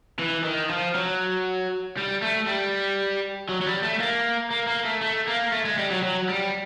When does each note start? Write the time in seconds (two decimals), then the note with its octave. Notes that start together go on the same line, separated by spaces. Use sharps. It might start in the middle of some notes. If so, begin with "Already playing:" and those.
0.19 E3
0.44 D#3
0.69 F3
0.95 F#3
1.97 G3
2.22 A3
2.47 G3
3.49 F#3
3.61 F#3
3.67 G3
3.83 A3
4.00 A#3
4.51 A#3
4.67 A#3
4.85 A3
5.02 A3
5.27 A#3
5.52 A3
5.65 G#3
5.78 G3
5.91 F#3
6.03 F#3
6.29 G3